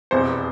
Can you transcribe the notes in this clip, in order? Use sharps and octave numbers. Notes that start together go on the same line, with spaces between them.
F1 E2 B2 C5